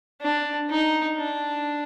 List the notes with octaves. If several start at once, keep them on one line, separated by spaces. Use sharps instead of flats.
D4
D#4
D4